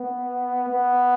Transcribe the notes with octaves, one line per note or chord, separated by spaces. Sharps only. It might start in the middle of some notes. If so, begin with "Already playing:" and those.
Already playing: B3
B3